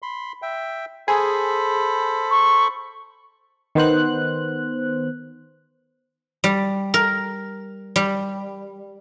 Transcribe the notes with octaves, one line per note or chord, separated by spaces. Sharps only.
B5 C6
E5 G5
G#4 A4 C5 B5
C#6
D#3 B3 C5 F#6
G3
A#4
G3